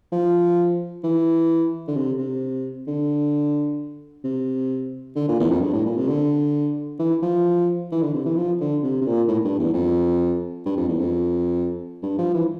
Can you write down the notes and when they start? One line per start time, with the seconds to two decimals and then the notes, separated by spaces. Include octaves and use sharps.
0.12 F3
1.04 E3
1.88 D3
1.96 C3
2.19 C3
2.87 D3
4.24 C3
5.16 D3
5.28 A#2
5.40 E2
5.50 F2
5.62 G2
5.74 A2
5.86 A#2
5.97 C3
6.08 D3
6.99 E3
7.22 F3
7.92 E3
8.03 D3
8.14 C3
8.26 E3
8.36 F3
8.61 D3
8.83 C3
9.01 C3
9.06 A#2
9.28 A2
9.44 G2
9.59 E2
9.74 F2
10.65 G2
10.77 F2
10.88 E2
11.00 F2
12.03 G2
12.19 F3
12.34 E3